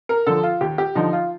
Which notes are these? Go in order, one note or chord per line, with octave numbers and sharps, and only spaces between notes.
A#4
D3 F3 A4
F4
D#2 G4
G4
D3 F3 D#4
F4